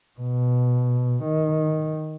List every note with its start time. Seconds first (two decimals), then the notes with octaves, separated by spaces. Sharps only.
0.20 B2
1.24 D#3